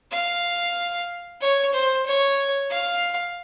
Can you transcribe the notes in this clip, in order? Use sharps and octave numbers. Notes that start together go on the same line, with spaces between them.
F5
C#5
C5
C#5
F5